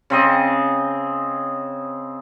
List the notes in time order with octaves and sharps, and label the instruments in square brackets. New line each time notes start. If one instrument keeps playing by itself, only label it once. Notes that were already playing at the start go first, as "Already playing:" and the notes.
[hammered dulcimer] C#3 C4 D#5